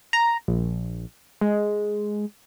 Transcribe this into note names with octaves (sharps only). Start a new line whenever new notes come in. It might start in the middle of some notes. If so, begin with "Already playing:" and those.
A#5
A#1
G#3